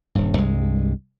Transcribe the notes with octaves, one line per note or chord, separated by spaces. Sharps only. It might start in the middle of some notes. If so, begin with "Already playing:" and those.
D#1 G2
C2 G2 G#3